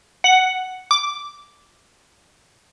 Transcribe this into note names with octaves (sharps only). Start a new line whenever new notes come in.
F#5
D6